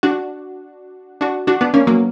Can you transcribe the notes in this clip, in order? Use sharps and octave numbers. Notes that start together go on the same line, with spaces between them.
D4 F#4
D4 F#4
D4 F#4
B3 D4
A#3 C#4
F#3 A#3